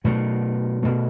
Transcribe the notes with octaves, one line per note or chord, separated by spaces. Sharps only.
B2 F#3 A3
B2 A3